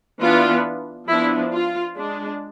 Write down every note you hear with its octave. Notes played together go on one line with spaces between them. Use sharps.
E3 B3 D4 F4
F3 B3 D4 E4
F4
G#3 D4